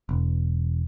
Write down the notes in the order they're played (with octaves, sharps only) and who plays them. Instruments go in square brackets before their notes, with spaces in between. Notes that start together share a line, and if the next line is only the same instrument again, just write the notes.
[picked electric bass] E1